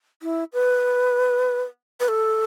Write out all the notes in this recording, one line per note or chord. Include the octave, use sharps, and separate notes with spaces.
E4
B4
B4
A4